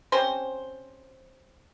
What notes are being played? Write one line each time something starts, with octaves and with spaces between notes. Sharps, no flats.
C4 C#4 G4 C5